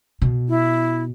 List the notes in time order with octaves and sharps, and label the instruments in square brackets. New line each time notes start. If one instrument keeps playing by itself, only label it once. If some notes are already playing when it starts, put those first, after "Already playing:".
[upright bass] B2
[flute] E4